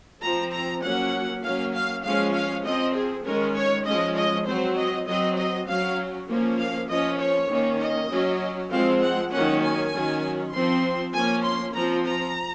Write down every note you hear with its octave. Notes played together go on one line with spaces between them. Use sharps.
F3 C4 A#5
A#5
F#3 A#3 C#4 F#5
F#3 A#3 C#4 F5
F5
F3 G#3 C#4 F5
F5
F3 C4 D#5
G#4
D#3 G#3 C#4 A#4
C#5
F3 G#3 C#4 D#5
D#5
F#3 C4 C5
D#5
F#3 C4 D#5
D#5
F#3 C#4 F5
F3 A#3 C#4
F5
F3 A#3 C#4 D#5
C#5
D#3 A#3 C#4
D#5
F#3 C#4
F3 G#3 C4 F5
F#5
D#3 F#3 A#3 C#4 F#5
G#5
D#3 F#3 C#4
F3 C4 C6
F3 A#3 C#4 G#5
C6
F3 C4 A#5
A#5